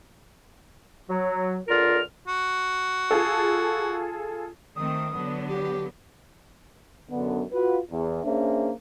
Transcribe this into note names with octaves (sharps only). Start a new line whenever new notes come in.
F#3
C#2 D3 F4 A#4 F6
F#4
F4 G#4 A4
D#3 A3 C4 D#6
D3 F#3 B3
G4
F#2 D3 B3
F4 F#4 B4
E2
A#3 C#4 D4 G#4 C5 E5